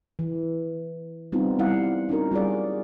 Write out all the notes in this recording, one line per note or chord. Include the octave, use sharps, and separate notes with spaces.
E3
G3 B3 C4 D#4 F4
G3 E4 F5 F#5
C#4 D#4 F#4 A#4
G3 F4 G#4 D5